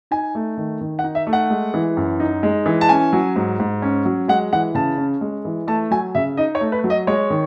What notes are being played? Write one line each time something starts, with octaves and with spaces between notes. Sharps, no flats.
D#4 G#5
A3
D#3
D#3
F#5
D#4
E5
A3
F#5
G#3
E3
F#2
D#4
G#3
E3
A5
C#4 G#5
F#3
G#2
G#2
C#4
F#3
G#3 F#5
E3 F#5
C#3 A5
C#4
G#3
E3
A3 A5
F#3 G#5
C#3 E5
D#4 D#5
C#5
A3
B4
F#3
D#5
G#3 C#5
D#3